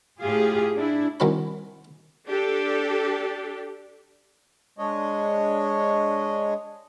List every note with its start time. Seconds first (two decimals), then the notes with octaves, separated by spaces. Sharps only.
0.21 A2 F4 G4 G#4 F5
0.77 D4 E4
1.20 C2 D#3 F#3 C#4 B5
2.28 D4 G4 A4
4.78 G#3 D4 C#5 D#5